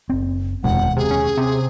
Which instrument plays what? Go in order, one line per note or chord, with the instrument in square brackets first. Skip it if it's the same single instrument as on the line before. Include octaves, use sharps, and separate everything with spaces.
[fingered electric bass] F#1 C4
[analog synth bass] F1 [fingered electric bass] D#2 B2 G#3 [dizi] F#5
[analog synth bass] C3 [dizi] G#4
[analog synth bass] C#4
C3